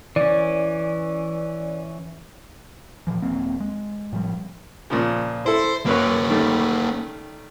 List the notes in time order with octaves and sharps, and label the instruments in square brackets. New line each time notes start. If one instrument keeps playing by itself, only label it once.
[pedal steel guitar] E3 C#4 [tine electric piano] D5
[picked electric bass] A#2 E3 F3
D#1 F#3 A#3 C4
G#3
A2 F3 G3
[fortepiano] A#2 C#3 F3
[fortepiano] E4 A4 [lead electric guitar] C5
[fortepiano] F#2 B4 C#5 [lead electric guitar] A#3 C#4
[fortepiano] D#3 G3 A3